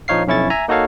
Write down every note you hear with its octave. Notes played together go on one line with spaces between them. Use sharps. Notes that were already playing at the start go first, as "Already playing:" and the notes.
A#1 F3 D#4 C#5 F5 C7
B1 F2 C#4 E4 C#6 A6
E5 G#5 A#5
A#3 D#4 F#4 A4 C#5 F5